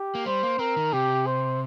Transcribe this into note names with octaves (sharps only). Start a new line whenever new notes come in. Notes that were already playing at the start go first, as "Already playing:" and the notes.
Already playing: G4
A#3
G3 C5
A#3
C4 A#4
D#3
C3 G4
C5